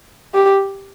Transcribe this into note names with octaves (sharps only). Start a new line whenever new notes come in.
G4